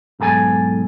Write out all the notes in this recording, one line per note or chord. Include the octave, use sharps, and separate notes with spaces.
B1 G#2 A4 G#5